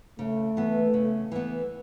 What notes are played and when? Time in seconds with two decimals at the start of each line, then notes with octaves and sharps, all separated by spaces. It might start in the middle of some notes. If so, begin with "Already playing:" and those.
0.19 C#3 A3
0.57 E3 B3
0.94 C#3
1.31 E3 B3